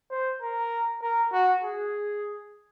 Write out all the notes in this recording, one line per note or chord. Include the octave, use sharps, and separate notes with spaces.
C5
A#4
A#4
F#4
G#4